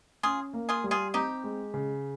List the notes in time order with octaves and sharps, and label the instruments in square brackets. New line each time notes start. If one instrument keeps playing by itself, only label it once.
[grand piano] C#4 [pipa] F4 G#4
[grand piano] A#3
[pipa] F4 G#4
[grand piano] G3
[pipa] F4 G#4
[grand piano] C4 [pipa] D#4 G4
[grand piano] G#3
C#3